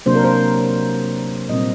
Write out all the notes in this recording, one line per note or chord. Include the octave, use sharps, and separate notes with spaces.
C3 F#3 A#3 D4 C5
A#4
C5
A#2 G3 C4 D#5